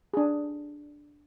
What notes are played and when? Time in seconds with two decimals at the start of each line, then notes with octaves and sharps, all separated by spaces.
0.14 D4 G#4